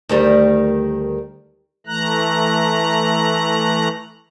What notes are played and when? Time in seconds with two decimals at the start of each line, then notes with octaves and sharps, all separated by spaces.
0.09 D2 D#3 G3
1.87 E3 A3 A#5 F#6